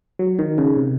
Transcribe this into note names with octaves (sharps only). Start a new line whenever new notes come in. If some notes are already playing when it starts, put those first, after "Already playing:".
F#3
D#3
C#3
C3